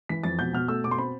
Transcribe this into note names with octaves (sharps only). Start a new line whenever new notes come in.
E3 B6
F2 A6
B2 G6
B2 F6
A3 E6
B2 D6
C6
C4 B5